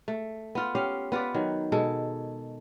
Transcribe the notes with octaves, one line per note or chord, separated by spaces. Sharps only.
A3
B3 F4
C#4 G4 F5
B3 F4 B4 D5
D#3 F#3
B2 G#3 A4